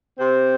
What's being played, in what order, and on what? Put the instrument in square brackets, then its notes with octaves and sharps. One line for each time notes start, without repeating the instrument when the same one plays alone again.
[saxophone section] C3 C4